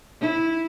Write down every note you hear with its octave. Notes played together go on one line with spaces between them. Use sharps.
E4